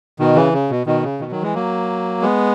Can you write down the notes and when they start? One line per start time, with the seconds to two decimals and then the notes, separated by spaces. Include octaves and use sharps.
0.19 B2 D#3
0.36 C#3 E3
0.53 C#3
0.70 B2
0.86 B2 D#3
1.03 C#3
1.20 B2 D#3
1.31 D#3 F#3
1.42 E3 G#3
1.54 F#3 A#3
2.22 G#3 B3